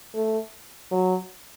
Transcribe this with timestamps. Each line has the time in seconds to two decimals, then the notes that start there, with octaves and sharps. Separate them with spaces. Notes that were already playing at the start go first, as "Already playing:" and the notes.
0.15 A3
0.91 F#3